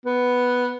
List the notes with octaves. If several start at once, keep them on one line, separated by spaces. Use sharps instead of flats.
B3